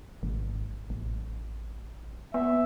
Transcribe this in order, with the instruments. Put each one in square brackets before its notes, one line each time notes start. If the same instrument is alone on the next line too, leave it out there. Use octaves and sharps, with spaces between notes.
[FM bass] G#1
A1
[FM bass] B3 [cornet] E5